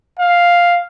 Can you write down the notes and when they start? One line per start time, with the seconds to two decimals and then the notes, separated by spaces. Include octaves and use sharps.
0.19 F5